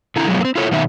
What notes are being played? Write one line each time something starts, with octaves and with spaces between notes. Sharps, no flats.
D3 E4 A#5
B2 F3 F#3 G#3
A#3 C4
E4 F4 A4 C#5
B2 D#3 F#3 D#4 E5